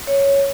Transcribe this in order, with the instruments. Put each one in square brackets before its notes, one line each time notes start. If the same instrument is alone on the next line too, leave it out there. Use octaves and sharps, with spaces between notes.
[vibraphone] C#5